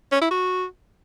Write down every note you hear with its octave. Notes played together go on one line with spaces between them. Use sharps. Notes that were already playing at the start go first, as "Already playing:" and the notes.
C#4
E4
F#4